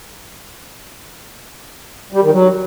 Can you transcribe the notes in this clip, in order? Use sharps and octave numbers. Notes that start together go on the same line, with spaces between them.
G3
D#3
F#3